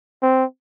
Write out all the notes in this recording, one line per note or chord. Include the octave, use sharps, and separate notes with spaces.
C4